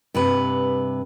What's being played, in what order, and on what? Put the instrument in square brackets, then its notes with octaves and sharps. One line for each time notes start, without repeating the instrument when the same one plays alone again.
[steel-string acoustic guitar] G2 C3 B4